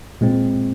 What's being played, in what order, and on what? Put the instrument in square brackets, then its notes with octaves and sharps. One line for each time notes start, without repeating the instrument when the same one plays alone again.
[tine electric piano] A#2 G#3 C4